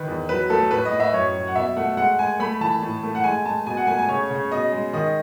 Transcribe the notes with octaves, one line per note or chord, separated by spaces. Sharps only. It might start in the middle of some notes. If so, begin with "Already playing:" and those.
Already playing: D#3 B4
E2
F#3 B4
A3 A4
A2 B4
D#5
A2
E5
F#2 C#5
F#3
F#5
B2 E5
A3 F#5
G#3 F#5
G#3 G#5
A3 B5
E3 A5
A2
A3
F#5
G#3 G#5
G#3 A5
B2 G#5
F#5
A3 G#5
G#5
C#3 C#5
C#3
B2 D#5
G#3
D#3 D#5